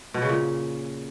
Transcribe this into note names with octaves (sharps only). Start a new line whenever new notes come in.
B2
C#3
A#2